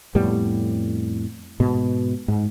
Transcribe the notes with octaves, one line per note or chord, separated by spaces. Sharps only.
F2 A2 G3 B3
G#2 B2
G#2